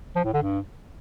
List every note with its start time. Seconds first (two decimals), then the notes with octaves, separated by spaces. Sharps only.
0.16 F3
0.25 A2
0.34 D3
0.43 G2